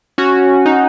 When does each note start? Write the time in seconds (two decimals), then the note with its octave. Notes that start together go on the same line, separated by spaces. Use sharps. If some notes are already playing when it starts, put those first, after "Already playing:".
0.18 C#4 F#4
0.66 D#4